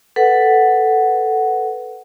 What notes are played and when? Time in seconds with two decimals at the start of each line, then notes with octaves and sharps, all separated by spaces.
0.16 A4 B4 F#5